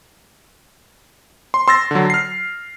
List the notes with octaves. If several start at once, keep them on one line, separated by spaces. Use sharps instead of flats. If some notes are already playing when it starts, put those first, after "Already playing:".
C6
C6 E6 A6 A#6
D3 F#3
F6 C7